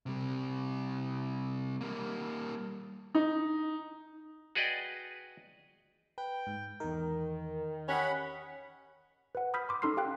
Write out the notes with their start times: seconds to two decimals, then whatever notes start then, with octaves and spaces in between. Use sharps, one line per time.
0.06 C3 G3
1.81 G3 A#3
3.15 D#4
4.55 F#4 G#4 B4 D5 D#5 G5
6.18 B4 G5
6.47 G#2
6.80 E2 D#3 A#4
7.88 C#4 G4 D#5 F#5 B5
9.35 B4 F#5
9.54 B5 D#6 F6 G6 B6
9.69 C6 D6
9.82 C#4 D#4 A4 C6 F6 C7
9.97 G4 F5 G5 F#6